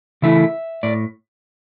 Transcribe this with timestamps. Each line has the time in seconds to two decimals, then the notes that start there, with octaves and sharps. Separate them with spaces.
0.22 C#3 E3 A3 E4 E5
0.83 A2 D5